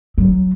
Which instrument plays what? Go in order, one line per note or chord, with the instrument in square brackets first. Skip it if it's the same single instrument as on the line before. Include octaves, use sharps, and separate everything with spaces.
[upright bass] F#3